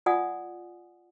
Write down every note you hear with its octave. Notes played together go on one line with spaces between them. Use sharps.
F4 D5 F#5 G#5 D#6